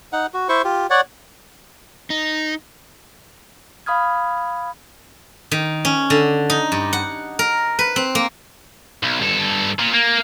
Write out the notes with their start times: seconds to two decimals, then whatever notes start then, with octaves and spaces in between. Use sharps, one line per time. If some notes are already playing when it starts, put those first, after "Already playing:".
0.13 D#4 F#5
0.34 F#4
0.49 E4 C5 C#6
0.64 F4 G4
0.90 C#5 D5 F#5
2.10 D#4
3.86 F5 B5 D#6 F6 G#6
5.51 D#3
5.85 C#4
6.10 D3
6.50 D#4
6.72 G2
6.93 F#5
7.39 A#4
7.79 B4
7.96 C4
8.15 A#3
9.03 B1
9.21 G2 A4
9.79 A#2
9.94 A#3